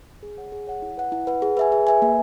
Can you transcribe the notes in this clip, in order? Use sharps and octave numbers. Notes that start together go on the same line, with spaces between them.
G#4
C#5 F#5
G#4
C#5 F#5
E4
B4 F#5
E4
B4 F#5
G#4
B4 E5 G#5
G#4
B4 E5 G#5
A#3